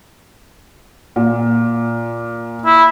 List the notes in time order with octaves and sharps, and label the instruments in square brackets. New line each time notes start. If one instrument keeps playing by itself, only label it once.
[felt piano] A#2
[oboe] E4